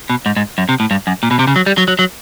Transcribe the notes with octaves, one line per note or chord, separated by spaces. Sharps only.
B2
G#2
G#2
F#2
C3
A2
G2
F#2
A#2
B2
C3
C#3
F#3
G3
F#3
F#3
F#3